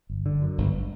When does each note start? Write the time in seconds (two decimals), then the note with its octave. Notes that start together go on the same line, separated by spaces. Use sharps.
0.09 G1
0.26 D3
0.42 F#2
0.58 G1